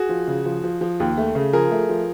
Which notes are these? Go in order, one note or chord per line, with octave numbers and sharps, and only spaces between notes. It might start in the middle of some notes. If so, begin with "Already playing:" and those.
Already playing: F#4 G#4
F3
C#3
F3
F3
F3
D#2
A3
C#3
F3 G#4 A#4
A3
F3